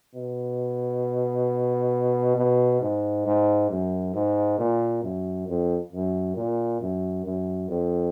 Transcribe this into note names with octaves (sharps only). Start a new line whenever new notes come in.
B2
B2
G#2
G#2
F#2
G#2
A#2
F#2
F2
F#2
A#2
F#2
F#2
F2